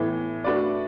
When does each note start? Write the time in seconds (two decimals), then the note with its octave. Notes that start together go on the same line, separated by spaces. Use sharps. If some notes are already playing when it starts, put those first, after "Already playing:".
Already playing: A2 E3 B3
0.44 A3 D4 F#4 B4 D5